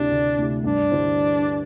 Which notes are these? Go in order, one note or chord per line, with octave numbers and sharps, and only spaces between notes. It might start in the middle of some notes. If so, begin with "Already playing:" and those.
Already playing: D2 C3 A3 D4 E4 G4
D2
C3 A3 E4 G4
G2 D4
D3 G3 E4 C5